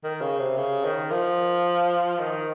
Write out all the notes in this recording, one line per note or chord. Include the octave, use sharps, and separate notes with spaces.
D#3
C#3
C3
C#3
D#3
F3
D#3